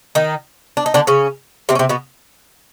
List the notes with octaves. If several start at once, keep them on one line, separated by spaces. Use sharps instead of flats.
D#3 D#4
D4
D#4
D3 D4
C#3 C#4
C3 C4
C#4
C3 C4
B2 B3